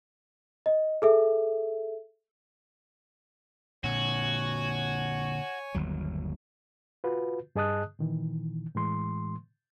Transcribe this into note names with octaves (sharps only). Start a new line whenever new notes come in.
D#5
G#4 A4 E5
A#2 D3 F#4 C#5 G#5
G1 D#2 F#3
F4 F#4 B4
G2 G#4 D#5 A5 D#6 F#6
A#2 D#3 E3
A2 E3 G#3 C6